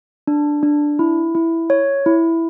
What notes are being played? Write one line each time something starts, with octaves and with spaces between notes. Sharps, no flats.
D4
D4
E4
E4
C#5
E4